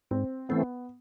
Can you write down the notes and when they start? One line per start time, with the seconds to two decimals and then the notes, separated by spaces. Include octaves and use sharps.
0.11 G#2 C4
0.49 E3 A3 B3 C4